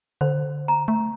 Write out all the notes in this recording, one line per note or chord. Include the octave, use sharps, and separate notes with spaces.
D3 C5
A#5
A3